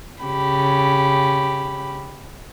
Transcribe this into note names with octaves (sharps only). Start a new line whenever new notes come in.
C#3 G4 B5